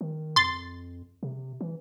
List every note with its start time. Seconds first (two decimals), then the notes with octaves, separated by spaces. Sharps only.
0.01 D#3
0.36 F2 C6 A6
1.23 C3
1.61 E3